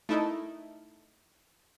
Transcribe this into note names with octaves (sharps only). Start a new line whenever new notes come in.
A3 D#4 E4 A4 A#4 D#5